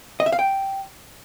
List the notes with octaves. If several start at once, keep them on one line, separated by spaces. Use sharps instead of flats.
D#5
E5
F5
G5